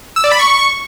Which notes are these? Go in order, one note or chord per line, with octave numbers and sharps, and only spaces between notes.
E6
D5
B5
C#6